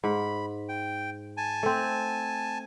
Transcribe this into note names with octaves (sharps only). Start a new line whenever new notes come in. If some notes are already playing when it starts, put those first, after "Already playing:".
G#2 B5
G5
G#5 A5
A3 C4